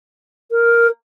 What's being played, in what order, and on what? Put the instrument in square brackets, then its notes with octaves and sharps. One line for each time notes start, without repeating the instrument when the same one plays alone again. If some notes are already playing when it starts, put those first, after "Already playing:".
[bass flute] A#4